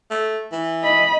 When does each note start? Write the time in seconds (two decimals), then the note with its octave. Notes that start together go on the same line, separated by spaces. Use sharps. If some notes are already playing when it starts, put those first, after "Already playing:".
0.11 A3
0.52 E3
0.84 D#5 B5